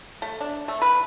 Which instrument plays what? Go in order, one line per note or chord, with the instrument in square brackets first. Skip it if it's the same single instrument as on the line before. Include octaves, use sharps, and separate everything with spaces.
[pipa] A3
D4
A3
B4